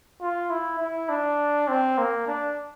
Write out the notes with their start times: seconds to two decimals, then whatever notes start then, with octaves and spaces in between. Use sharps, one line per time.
0.21 F4
0.50 E4
0.79 E4
1.09 D4
1.68 C4
1.98 A#3
2.27 D4